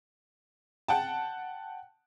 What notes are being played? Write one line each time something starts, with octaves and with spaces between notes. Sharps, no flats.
F#5 G5 A5